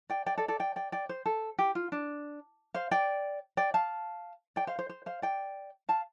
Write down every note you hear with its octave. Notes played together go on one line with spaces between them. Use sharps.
D5 G5
D5 G5
A4 D5
A4 D5
D5 G5
D5 G5
D5 G5
C5
A4
G4
F4
D4
C5 F5
D5 G5
D5 G5
F5 A5
D5 G5
C5 F5
C5
C5
C5 F5
D5 G5
F5 A5